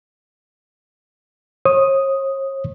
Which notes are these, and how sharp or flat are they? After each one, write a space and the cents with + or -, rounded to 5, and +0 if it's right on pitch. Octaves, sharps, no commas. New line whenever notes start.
C#5 -40 D#6 +0